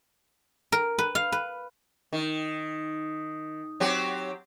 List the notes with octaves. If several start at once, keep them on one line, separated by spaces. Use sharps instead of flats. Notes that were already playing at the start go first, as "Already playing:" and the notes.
A#4
B4
F5
B4
D#3
F#3 C4 G4